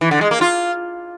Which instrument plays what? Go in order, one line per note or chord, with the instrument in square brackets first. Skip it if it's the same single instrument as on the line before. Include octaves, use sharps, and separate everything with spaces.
[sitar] E3
D3
G#3
A#3
F4